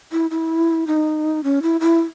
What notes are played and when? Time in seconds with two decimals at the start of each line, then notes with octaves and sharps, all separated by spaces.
0.12 E4
0.31 E4
0.87 D#4
1.44 C#4
1.62 E4
1.81 E4